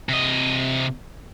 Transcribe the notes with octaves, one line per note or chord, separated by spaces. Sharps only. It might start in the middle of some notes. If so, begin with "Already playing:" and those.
C3 D#5